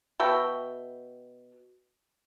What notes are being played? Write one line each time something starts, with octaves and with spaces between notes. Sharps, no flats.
B2 F#4 E5 G5